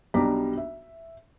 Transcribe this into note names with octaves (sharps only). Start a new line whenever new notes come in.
B1 G3 D4 A#5 D6 B6
E5